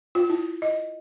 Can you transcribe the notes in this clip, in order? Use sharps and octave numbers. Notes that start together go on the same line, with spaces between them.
F4
E4
D#5